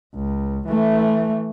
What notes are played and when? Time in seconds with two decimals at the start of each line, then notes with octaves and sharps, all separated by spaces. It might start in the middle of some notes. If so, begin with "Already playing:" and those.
0.15 C#2
0.68 E3 A3